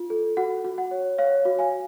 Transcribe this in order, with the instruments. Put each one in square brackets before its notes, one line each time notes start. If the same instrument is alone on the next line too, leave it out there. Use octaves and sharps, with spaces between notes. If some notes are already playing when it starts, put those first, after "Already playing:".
Already playing: [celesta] F4
A4
F#4 F#5
F#4
F#5
C#5
C#5 F5
F#4
F5 G#5